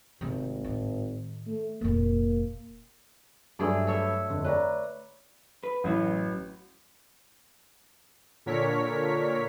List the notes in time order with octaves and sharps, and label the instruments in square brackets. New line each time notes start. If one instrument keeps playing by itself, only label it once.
[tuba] G#1 [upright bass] C3 A3
[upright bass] A2 D#3
[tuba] A3
[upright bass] F1 A#2 [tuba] A#3
[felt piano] G2 F#3 [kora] A3 G#4 D5
[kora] A4 C#5 E5
[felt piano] F1 D3
[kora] B4 [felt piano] C#5 D5 A#5
[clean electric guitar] B4
[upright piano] A1 [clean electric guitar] F#2 F#3 B4
[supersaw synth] A#2 D3 A#4 C#5 B6